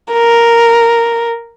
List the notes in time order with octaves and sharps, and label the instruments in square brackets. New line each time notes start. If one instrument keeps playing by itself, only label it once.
[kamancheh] A#4